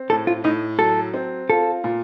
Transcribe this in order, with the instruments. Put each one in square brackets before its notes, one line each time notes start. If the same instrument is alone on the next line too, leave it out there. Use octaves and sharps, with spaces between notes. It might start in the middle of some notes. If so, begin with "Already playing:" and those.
Already playing: [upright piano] C4
[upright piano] A2 [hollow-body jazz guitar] A4
[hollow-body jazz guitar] F4
[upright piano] A2 [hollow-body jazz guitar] D#4
[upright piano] F#3 [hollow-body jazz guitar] A4
[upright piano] C4
[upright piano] F4 [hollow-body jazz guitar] A4
[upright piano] A#2